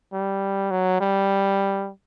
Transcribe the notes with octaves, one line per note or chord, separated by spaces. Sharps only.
G3
F#3
G3